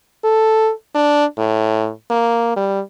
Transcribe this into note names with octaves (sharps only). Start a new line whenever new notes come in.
A4
D4
A2
A#3
G3